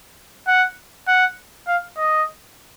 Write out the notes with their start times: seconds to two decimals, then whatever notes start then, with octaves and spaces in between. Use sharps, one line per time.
0.48 F#5
1.08 F#5
1.68 F5
1.97 D#5